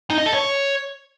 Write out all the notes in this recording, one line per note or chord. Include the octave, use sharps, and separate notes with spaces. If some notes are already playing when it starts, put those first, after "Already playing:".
D#4
D#5
A4
C#5